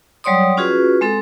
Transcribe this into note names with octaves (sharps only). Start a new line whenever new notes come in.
F#3 G3 C#5 D5 C6 D#6
C#4 F4 F#4 G#4 B4
G#3 C4 A4